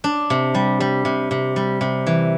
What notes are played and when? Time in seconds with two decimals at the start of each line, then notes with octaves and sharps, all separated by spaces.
0.04 D4
0.30 C3
0.55 G3
0.80 G3
1.05 C3
1.31 C3
1.56 G3
1.81 C3
2.07 E3